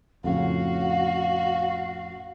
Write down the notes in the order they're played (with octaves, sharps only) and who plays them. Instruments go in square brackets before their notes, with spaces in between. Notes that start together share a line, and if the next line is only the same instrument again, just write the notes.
[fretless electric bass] F2 A2 C#3 [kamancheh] F#4 [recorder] F5